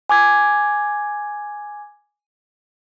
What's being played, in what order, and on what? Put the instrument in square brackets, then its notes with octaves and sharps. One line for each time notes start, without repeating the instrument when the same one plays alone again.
[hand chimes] G#5 D6 G#6